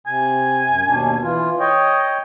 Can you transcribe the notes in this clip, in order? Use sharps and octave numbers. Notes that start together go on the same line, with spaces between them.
C3 G#5
F#2
D#2 B2 D4
E3 F4
C#5 D#5 G5